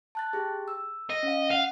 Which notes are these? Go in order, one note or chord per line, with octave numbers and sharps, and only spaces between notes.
A5 F#6 A6
G4 G#4
E6
D#5
C#4 F5
F5 F#5